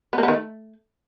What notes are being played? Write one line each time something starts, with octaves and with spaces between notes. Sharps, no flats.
B3
A#3
B3
D#3
A3